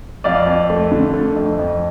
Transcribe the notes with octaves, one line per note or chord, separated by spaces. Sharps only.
F2 D5 F5
F2
A3
D3
A3
F2
F2